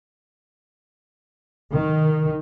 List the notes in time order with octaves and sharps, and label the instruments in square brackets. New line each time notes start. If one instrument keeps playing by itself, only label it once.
[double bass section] D#3